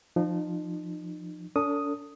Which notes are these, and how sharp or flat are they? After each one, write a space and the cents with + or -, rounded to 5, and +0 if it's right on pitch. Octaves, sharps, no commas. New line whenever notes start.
F3 +0 D#4 -35
D4 -40 A4 +35 D#6 +0